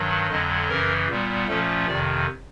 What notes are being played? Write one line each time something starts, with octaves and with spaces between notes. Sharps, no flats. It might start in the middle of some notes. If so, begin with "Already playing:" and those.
Already playing: G2 D#3 F#3
F2 D3 F#3 D#5
F#2 C#3 E3 A#4
A#2 G3 B3
A#2 F3 A3 C#4 A4
F2 C3 D#3 D5